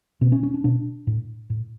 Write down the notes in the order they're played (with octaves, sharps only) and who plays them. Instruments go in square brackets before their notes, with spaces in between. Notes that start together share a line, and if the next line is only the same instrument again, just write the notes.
[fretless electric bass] B2 C4
C#4
C#4
D4
B2 D4
A2
A2